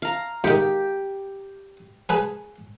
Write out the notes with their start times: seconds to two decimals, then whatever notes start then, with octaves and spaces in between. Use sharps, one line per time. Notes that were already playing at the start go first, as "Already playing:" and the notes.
0.02 F5 A#5
0.44 G#2 D#3 G4
2.09 G#4 B4 A5